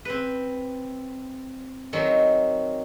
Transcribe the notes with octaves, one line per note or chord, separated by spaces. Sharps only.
C4 B4
D#3 F#3 C4